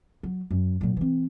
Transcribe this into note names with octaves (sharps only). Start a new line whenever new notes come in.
F#3
F#2
A#2 F#3
E3 C4